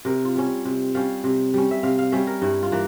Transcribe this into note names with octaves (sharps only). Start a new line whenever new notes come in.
C3 A#4
F4
G3 C#4
C3
G3 C#4 F5
C3
G3 C#4
E5
C3 F5
F5
G3 C#4 E5
A#4
G2 E4
F4
E3 A#3